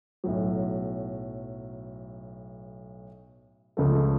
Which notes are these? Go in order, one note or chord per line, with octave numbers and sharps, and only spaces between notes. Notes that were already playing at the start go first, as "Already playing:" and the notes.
B1 A2 F#3
C#2 C#3 F3 A3